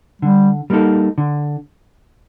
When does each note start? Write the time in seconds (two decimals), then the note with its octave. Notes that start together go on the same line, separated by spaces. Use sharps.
0.22 D3 G3
0.70 G3 A#3 D#4 A4
1.18 D3